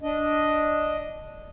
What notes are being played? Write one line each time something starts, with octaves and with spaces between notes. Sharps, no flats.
D4 D#5